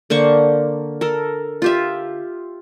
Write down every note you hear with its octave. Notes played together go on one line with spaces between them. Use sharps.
D3 A#3 C5 C#6
A4 A#4
F4 G4 E5